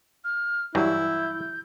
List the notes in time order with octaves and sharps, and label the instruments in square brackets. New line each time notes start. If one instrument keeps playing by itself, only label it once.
[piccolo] F6
[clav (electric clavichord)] G2 E3 F#3 [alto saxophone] E4 [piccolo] G6